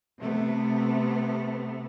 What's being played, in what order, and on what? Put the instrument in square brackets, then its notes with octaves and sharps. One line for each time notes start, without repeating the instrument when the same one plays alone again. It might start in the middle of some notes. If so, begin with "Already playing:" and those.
[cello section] C3 A3 B3